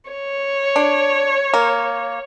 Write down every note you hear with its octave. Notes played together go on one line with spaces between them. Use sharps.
C#5
D4
A#3